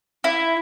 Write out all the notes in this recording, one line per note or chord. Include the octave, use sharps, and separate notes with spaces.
E4